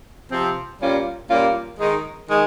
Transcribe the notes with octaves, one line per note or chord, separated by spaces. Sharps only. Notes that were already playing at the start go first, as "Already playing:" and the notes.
C3 F3 C4
A#2 G3 A#3 C#4 F4
A#2 G3 A#3 C#4 F4
D#3 G#3 D#4
D#3 G#3